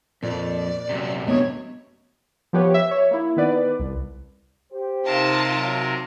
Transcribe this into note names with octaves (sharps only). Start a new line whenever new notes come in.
F2 A#2 D5
F#2 C3
A3 B3 D4 C#5 D#5
F3 B3 G4 B4 C#5
E5
C#5
A#3 E4
D#3 B3 B4 D5
C2
G4 C5
C3 D#4 F4 A#4 A5
F#3